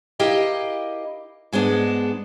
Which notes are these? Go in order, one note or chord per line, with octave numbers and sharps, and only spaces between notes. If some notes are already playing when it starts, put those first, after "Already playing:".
E4 G4 A#4 D#5 F5
G#2 G#3 B3 D4